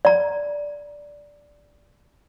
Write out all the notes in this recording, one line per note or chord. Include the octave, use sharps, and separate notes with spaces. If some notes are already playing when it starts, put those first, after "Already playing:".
D5 A#5